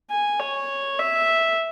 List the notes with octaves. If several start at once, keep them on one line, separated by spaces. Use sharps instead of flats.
G#5
C#5
E5